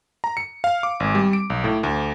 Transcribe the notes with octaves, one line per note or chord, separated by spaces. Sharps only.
A#5
C#7
F5
D6
G#1
G3
D7
B1
A2
D2